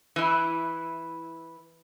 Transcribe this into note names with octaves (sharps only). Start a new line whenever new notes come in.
E3 E4